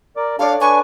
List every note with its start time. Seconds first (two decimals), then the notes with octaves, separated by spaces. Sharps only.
0.17 A#4 D5 D6
0.39 D4 A4 C#5 D5 F5
0.61 D4 B4 G#5 C#6